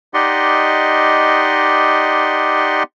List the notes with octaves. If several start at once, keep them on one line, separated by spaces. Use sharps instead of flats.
D#4 G4 D5 D#5 F#5 C6